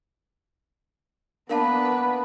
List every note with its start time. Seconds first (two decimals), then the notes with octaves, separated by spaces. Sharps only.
1.49 A#3 B3 D4 A#4 B4 F5 A5